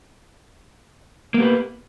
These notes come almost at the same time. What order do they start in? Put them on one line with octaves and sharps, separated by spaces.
A#3 B3 G4 B4